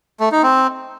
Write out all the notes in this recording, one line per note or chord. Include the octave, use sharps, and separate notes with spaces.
A3
D#4
C4